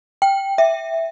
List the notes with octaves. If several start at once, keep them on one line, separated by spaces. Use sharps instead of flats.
G5
E5